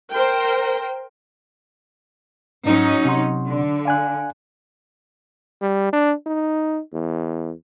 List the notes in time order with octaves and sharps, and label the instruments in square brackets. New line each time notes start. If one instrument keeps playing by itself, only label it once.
[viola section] A#4 C5 G5
[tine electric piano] G#2 [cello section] F#3 C#4 D#4
[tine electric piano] C3 F#5 C6
[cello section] D3
[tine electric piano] F5 G#5 F#6
[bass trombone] G3
D4
D#4
E2